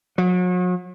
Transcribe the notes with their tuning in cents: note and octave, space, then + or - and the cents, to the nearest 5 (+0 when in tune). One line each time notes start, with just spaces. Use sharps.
F#3 -40